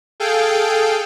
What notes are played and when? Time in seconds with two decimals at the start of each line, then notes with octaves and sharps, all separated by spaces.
0.20 G#4 A4 F5 G5